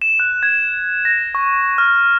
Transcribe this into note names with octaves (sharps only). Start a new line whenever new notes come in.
E7
F#6
G#6
A#6
C#6
F6